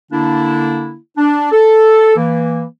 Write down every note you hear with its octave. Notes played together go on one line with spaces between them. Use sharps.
D3 A#3 D4 E4
D4
A4
E3 A#3